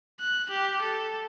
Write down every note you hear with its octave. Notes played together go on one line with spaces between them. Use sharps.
F#6
G4
A4